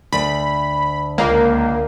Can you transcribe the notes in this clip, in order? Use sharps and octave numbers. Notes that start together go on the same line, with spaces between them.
D2 B5
C#2 A#3